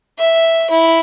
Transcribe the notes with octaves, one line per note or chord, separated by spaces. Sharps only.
E5
E4